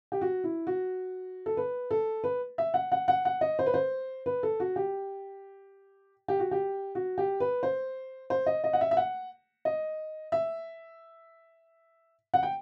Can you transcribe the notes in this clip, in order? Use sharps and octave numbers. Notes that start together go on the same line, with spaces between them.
G4
F#4
E4
F#4
A4
B4
A4
B4
E5
F#5
F#5
F#5
F#5
D#5
C5
B4
C5
B4
A4
F#4
G4
G4
F#4
G4
F#4
G4
B4
C5
C5
D#5
D#5
F#5
E5
E5
F#5
D#5
E5
F#5
G5